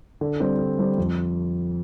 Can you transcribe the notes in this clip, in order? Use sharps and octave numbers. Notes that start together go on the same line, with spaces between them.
D3
G3 C4
D3
G3 C4
F2